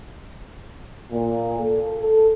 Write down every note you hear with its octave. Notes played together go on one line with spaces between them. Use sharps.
A#2
A4
A4